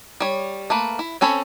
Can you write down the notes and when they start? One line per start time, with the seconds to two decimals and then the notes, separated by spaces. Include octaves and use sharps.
0.20 G3 C#5
0.70 A3 A#3 B4
0.99 E4
1.21 C4 C#4 A4 C#5 B5